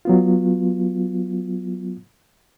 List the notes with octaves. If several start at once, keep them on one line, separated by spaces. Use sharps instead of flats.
F#3 B3 F4